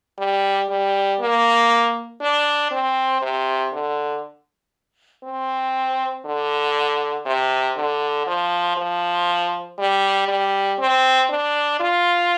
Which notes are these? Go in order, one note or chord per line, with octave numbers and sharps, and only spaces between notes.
G3
G3
A#3
D4
C4
C3
D3
C4
D3
C3
D3
F3
F3
G3
G3
C4
D4
F4